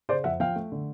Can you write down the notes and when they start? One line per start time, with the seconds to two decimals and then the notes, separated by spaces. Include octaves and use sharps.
0.09 C#3 C5 D5
0.24 F2 E5 F#5
0.40 F3 F5 G5
0.56 A3
0.72 D3